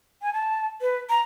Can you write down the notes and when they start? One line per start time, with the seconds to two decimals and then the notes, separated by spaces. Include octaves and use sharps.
0.22 G#5
0.33 A5
0.81 B4
1.10 A#5